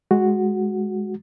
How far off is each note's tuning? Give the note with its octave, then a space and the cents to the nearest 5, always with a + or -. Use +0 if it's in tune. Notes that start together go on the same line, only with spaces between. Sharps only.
G#3 +0 F#4 +0